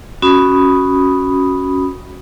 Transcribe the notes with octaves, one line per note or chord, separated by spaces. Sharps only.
C#4 F#4 B5 D#6